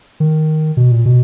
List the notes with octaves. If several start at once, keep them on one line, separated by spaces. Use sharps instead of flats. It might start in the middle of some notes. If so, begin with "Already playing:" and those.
D#3
B2
A#2
B2